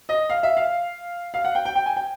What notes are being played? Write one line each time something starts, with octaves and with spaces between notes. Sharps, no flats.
D#5
F5
E5
F5
F5
F#5
G5
G5
G5
G#5
G5